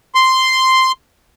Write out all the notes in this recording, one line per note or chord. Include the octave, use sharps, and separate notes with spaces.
C6